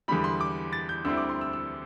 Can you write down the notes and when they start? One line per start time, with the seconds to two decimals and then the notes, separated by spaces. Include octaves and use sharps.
0.08 E2 D3 G3 B5
0.24 C6
0.41 D6
0.73 A6
0.89 G6
1.05 D2 D3 G3 C4 E4 E6
1.17 D6
1.29 C6
1.41 E6
1.53 E6